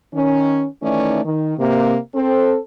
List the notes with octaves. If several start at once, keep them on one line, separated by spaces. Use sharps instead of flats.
D#3 C#4
D#3 E3 A3 C#4 D#4 D5
D#3
C3 A#3
C4 A4